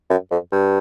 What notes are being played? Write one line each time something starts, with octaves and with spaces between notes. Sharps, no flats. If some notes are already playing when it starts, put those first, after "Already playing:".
F#2
F2
G2